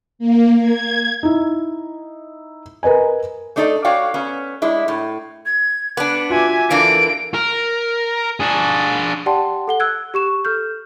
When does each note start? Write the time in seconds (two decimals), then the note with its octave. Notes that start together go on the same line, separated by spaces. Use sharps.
0.19 A#3
0.60 G#6
1.23 D#4 E4
2.83 A#4 B4 D#5 G#5
3.56 A3 D4 D#4 A4 D5
3.84 F#4 C#5 D5 F5 G5
4.14 B3 C#4
4.62 G#3 D4 E4
4.88 A2
5.46 G#6
5.97 B3 D4 D6
6.30 F4 F#4 E5 G#5
6.70 E3 A#3 D4 A4 D7
7.34 A#4
8.40 D4 G#4
9.26 G4 D5 F#5 G5 A5 C6
9.68 A4 F#5 G7
9.80 E6 F#6 G#6
10.14 G4 C#6 E7
10.45 A4 F6 G6